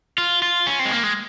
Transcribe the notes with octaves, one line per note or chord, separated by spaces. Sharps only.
F4
F4
C#4
C4
G#3
A#3
G#3